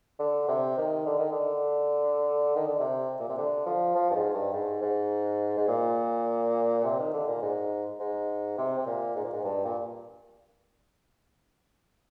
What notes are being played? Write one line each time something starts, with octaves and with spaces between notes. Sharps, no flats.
D3
C3
D#3
D3
D#3
D3
D#3
D3
C3
A#2
C3
D3
F3
F3
G2
G#2
G2
G#2
G#2
G#2
A#2
C3
D#3
D3
A#2
G#2
G#2
C3
C3
A#2
G#2
A#2
G#2
G2
A#2